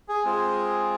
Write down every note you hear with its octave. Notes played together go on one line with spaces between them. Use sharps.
G#4
G#3 C4 F4 G#4